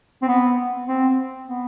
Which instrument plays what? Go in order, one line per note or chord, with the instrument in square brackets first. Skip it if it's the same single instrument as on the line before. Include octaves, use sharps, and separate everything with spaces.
[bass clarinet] C4
B3
C4
B3